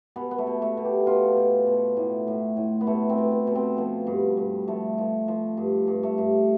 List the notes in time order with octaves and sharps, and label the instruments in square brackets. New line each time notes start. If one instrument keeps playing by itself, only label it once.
[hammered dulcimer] B2 B3
B3
A3
B2
A3
B2
G4
B2 F4
B2
B2
A2
A2
A2
B3
B2 A3
C4
B2
B3
B2
C4
F3 B3
G2
G2
F3 A3
F3
F3
G2
G2
A3
G2